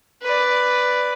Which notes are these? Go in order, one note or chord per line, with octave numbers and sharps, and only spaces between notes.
B4 D5